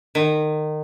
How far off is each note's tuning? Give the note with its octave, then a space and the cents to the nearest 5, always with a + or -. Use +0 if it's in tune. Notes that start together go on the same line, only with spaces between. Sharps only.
D#3 -25